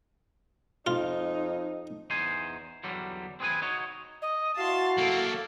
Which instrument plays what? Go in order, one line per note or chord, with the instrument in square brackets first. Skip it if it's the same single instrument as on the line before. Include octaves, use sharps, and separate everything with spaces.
[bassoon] F2 [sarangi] D#4 [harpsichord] F4
[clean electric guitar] E2 D#4 C5 G#5
E2 D3 F#3 G3
C4 G#4 B4 G#5
D#4 F#4 C#5
[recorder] D#5
[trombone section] E4 F#4 [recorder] F5 [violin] A5 C6
[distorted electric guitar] F#3 A#3 [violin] A4